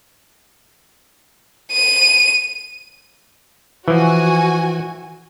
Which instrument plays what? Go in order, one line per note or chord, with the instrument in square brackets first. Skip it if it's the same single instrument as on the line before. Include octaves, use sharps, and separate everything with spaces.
[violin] D#7
[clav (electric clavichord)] E3 F3 [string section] F#4 G#5